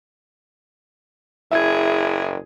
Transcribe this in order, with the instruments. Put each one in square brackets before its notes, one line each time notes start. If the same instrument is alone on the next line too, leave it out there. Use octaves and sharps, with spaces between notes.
[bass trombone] F#1 [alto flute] E4 [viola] G#4 [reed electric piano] E5 G#6